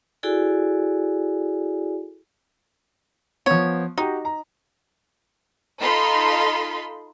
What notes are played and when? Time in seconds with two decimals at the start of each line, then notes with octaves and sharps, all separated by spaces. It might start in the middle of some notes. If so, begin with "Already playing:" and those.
0.23 E4 F#4 G#4 A4 D5 G#5
3.46 F3 B3 C#5
3.98 D#4 F#4 G4
4.25 A#5
5.80 D#4 F4 A4 B5 C6 B6